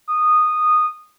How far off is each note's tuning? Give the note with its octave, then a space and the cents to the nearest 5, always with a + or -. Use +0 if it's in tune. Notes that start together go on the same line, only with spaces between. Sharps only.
D#6 -15